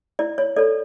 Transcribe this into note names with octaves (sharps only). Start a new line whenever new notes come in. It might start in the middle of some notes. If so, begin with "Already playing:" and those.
E4 D5
C#5
A4 C#5 D5